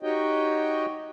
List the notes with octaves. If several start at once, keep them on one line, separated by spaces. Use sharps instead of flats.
D#4 F#4 G4 C#5 D#5 G5